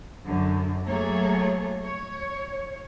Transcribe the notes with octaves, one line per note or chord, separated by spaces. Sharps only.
F#2 D3
F#3 A3 A#3 G#4 A4 C#5
C#5